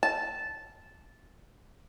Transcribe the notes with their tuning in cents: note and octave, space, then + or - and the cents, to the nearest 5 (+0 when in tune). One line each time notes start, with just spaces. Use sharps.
A5 -10